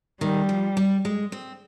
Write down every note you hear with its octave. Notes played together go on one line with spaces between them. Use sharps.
D#3 G3
F3
G3
G#3
C4